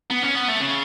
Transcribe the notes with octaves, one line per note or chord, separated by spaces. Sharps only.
B3
C#4
B3
A3
C#3